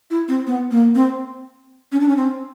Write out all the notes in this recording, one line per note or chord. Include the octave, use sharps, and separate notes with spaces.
E4
C4
B3
A#3
C4
C#4
D4
C#4
C4